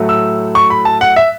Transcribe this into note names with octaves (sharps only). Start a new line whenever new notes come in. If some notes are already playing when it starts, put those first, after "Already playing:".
Already playing: A2 F#3 A3
E6
C#6
B5
A5
F#5
E5